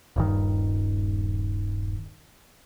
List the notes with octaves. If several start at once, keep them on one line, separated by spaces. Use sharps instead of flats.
D#1 G2 D#3